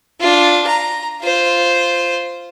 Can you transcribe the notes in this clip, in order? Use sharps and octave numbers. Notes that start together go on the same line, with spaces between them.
D4 F4
A#5
F4 C5